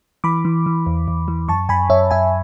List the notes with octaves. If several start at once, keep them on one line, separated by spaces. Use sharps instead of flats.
E3 B5 D6
E3
E3
E2
E2
E3
F#2 A5 C#6
F#2 G#5 B5
F#2 C#5 E5
F#2 E5 G#5